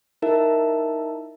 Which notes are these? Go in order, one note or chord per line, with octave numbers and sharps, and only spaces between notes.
D#4 E4 A#4 E5 A5